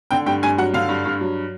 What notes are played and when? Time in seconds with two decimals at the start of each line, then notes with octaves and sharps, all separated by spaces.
0.11 D3 G5
0.26 G2 G5
0.42 G2 G#5
0.58 F#3 F#5
0.74 D3 F5
0.89 G2
1.05 G2
1.21 F#3